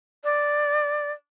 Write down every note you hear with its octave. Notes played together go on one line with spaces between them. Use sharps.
D5